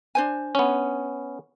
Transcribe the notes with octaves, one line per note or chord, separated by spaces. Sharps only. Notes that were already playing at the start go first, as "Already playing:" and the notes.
D4 C5 G#5
B3 C#4